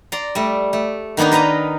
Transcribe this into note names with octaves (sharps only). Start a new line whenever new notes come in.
D5 A#5 C6
G3 A3
A3
D#3 A#3 B3 D4 D#4
A#4 B4 D#5 A#5